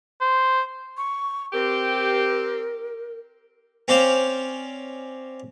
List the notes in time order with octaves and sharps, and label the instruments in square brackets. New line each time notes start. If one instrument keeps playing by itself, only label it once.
[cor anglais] C5
[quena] C#6
[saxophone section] C4 G4 [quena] A#4
[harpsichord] C4 C#4 C5 D5 F5